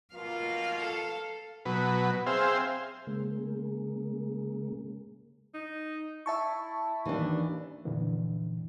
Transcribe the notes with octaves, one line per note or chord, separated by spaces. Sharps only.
B2 A#3 F4 F5
A4
B2 F#3 B4
C4 G#4 C5 E5 F5 G5
C#3 G#3 A#3
D#4
E4 E5 A5 C#6
D#2 E3 D4
F2 A#2 D3 E3